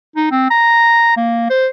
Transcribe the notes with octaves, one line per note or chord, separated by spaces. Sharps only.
D#4
C4
A#5
A#3
C5